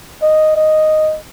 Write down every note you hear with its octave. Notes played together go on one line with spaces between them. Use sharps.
D#5
D#5